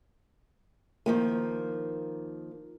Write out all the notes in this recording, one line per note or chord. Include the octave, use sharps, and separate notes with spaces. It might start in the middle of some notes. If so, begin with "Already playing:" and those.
D#3 F3 A#3